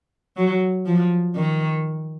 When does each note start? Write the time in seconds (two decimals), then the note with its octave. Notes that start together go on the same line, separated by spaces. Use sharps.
0.37 F#3
0.86 F3
1.36 D#3